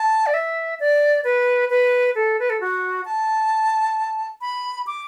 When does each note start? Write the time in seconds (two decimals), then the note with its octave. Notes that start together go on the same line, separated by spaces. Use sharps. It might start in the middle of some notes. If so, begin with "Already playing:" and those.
Already playing: A5
0.26 D5
0.34 E5
0.80 D5
1.24 B4
1.70 B4
2.15 A4
2.39 B4
2.50 A4
2.61 F#4
3.05 A5
4.41 B5
4.87 D6